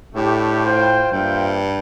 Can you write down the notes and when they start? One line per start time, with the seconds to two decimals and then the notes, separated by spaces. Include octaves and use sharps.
0.15 A2 A3 D4 G4
0.64 F4 C5 G5
1.12 G2 A#3 F4 C5 E5 G5